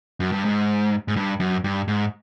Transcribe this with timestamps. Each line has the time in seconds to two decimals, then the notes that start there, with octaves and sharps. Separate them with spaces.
0.20 F#2
0.32 G2
0.45 G#2
1.08 G#2
1.16 G2
1.40 F#2
1.64 G2
1.88 G#2